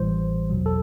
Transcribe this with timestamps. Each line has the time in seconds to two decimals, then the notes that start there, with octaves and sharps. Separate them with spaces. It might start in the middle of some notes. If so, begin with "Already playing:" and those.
Already playing: A1 A2 E3 G3 C5
0.50 E2 B2 F#3
0.66 A4